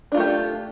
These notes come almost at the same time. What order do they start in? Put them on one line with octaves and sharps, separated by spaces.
D4 F4 A3 G4